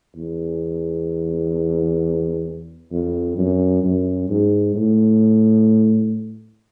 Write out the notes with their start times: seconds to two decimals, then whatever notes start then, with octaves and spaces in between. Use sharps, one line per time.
0.16 E2
2.92 F2
3.38 F#2
3.84 F#2
4.29 G#2
4.75 A2